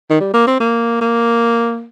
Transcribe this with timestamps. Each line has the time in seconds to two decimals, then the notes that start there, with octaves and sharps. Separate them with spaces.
0.10 D#3
0.20 G3
0.34 A#3
0.47 C4
0.60 A#3
1.01 A#3